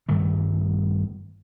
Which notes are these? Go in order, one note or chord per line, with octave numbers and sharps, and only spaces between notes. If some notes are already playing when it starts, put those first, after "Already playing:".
G2 D#3 G3 A3